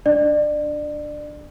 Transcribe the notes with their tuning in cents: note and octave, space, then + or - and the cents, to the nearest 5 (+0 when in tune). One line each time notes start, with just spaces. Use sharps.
D4 +0 D5 +30